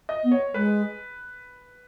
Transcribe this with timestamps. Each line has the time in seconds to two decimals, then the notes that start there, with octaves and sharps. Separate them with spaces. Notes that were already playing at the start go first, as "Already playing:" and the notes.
0.09 D#5
0.24 B3
0.31 C#5
0.54 G#3 B4